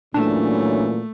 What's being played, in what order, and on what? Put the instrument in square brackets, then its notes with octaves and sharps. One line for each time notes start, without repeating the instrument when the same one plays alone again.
[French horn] A#2 [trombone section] E3 F#3 C#4 [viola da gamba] A3 [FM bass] D4